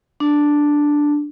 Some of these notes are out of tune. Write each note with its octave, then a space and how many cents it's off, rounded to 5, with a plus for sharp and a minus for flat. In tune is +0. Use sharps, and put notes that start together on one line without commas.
D4 +0